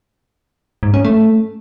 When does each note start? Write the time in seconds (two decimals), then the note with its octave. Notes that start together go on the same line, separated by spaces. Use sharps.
0.83 G#2
0.94 C#4
1.05 A3